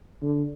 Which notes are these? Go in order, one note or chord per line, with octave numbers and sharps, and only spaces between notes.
D3